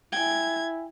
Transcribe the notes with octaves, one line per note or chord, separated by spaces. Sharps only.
E4 G5 G#5 G#6